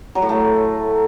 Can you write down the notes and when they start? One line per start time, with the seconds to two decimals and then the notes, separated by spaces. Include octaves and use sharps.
0.15 F#3
0.22 A2
0.29 A3